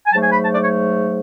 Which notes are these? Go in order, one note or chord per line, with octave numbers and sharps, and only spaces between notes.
G#5
G#2 F#3 A3 A5
G#5
B5
A5
D5
C#5